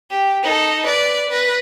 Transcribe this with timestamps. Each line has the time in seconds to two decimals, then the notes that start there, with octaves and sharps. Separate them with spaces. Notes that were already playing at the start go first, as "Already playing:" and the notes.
0.11 G4
0.43 D#4 A4
0.87 B4 D5
1.29 B4 A#6